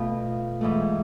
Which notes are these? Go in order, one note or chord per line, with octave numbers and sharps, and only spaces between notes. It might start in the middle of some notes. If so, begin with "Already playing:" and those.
Already playing: B2 A3 F4
G#2 E3 A3